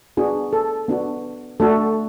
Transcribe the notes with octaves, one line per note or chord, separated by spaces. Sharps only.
B3 D4 F#4 G#4
A4
B3 D4 F#4
A3 D4 F#4 A4